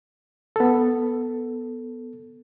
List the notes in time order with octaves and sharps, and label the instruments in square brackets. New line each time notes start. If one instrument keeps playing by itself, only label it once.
[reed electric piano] B3 A4